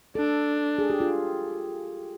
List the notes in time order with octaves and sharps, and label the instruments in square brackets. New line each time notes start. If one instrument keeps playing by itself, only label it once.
[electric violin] D4 [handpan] A4
[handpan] G#4
G4
F4